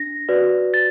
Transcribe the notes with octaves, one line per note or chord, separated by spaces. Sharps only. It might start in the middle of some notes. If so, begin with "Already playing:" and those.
Already playing: D4 A#6
F#4 B4 D5
A6